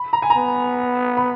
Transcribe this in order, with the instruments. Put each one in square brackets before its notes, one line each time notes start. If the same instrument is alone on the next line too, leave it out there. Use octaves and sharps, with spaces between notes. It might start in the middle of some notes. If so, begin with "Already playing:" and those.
Already playing: [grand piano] B5
A#5
G#5
A#5
[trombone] B3
[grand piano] B5